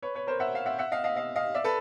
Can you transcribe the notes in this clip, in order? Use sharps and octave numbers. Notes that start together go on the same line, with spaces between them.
B4 C#5
B4 C#5
A#4 C5
E5 F#5
F5
E5 F#5
E5 F#5
D#5 F5
D#5 F5
D#5 F5
D#5 F5
D5 E5
A4 B4